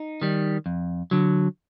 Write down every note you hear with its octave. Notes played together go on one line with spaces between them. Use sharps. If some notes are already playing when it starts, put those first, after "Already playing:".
Already playing: D#4
D#3 G3
F2
D3 F#3